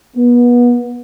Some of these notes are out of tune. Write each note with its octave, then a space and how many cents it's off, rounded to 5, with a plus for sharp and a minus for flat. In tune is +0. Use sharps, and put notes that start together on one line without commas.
B3 -30